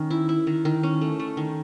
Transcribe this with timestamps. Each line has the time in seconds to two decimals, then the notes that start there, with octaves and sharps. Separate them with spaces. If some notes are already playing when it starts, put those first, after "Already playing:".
Already playing: D#3 C#4
0.11 E4
0.29 E4
0.47 D#3
0.65 D#3
0.83 C#4
1.01 A3
1.19 A3
1.37 D#3